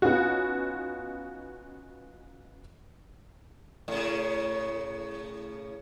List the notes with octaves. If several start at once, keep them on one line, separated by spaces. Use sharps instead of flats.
B3 C#4 D#4 F4 F#4
A2 C#3